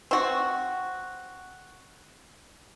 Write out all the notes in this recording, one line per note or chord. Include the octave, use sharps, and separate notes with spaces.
C4 F#4